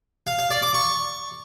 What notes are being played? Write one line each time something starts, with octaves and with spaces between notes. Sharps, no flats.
F5
F5
D5
D6
C#6